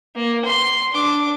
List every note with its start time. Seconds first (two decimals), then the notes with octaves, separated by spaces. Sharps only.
0.16 A#3
0.45 C6
0.93 D4 D6